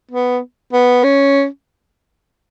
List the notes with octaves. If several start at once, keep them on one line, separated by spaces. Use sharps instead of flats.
B3
B3
C#4